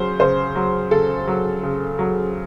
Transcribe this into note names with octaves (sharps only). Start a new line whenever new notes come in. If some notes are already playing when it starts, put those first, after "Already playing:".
Already playing: C#3 F#3 C5
C#3 C5
F#3
C#3 A4
F#3
C#3
F#3